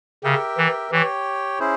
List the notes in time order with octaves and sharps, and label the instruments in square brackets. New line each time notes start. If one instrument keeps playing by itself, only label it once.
[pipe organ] C#3 [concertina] G4 A#4 E5 G5
[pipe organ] E3
[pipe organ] E3 [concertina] G4 C#5 G5
[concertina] C#4 E4 G#4 C5